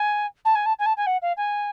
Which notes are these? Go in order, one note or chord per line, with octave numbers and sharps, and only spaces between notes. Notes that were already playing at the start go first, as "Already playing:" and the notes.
Already playing: G#5
A5
G#5
A5
G#5
A5
G#5
F#5
F5
G#5